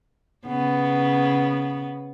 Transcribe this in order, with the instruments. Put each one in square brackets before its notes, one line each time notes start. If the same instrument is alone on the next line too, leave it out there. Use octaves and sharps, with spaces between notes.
[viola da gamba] C#3 B3